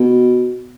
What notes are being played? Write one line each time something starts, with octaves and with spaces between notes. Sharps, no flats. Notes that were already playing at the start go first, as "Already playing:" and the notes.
Already playing: B2